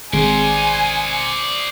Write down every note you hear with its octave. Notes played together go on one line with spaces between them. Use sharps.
G#1 C5 D5 G#5